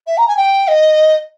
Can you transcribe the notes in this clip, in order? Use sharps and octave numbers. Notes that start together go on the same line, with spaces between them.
E5
A#5
G#5
G5
D#5